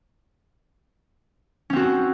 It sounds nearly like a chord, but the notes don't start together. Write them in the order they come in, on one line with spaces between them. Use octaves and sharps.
C#4 C4 F#4